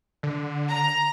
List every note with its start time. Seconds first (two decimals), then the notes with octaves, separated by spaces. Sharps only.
0.23 D3
0.70 A#5